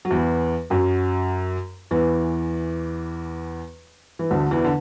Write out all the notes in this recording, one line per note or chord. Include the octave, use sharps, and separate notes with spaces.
F#3
E2 E3
F#2 F#3
E2 E3
E3
D2 D3
E2 E3
D3